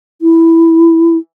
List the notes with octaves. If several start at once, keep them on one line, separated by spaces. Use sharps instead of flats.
E4